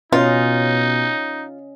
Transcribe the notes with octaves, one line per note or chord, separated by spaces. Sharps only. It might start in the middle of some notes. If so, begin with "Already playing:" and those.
B2 C#4 D#4 F4 D#5